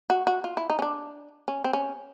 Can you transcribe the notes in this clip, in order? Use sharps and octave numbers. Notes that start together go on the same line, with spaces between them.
F#4
F#4
F4
E4
D#4
C#4
D4
C#4
C4
C#4